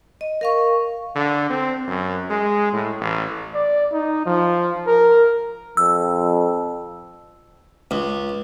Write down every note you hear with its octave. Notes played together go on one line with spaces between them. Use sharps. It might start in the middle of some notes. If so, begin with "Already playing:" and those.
D#5
A#4 F5 C#6
D3
C4
F#2
G#3
A2
A1
D5
D#4
F3
A#4
F2 E6
C#2